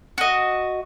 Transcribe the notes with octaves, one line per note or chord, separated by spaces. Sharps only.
F#4 D#5